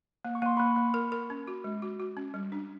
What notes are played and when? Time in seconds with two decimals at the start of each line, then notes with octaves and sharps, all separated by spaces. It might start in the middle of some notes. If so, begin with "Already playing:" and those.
0.25 A#3
0.35 C#6
0.42 A#3 C6
0.57 A#3 B5 C#6
0.76 A#3
0.94 A#4
1.12 A#4
1.30 C#4
1.48 F#4
1.64 G#3
1.82 F#4
2.00 F#4
2.17 C#4
2.34 G3
2.52 D4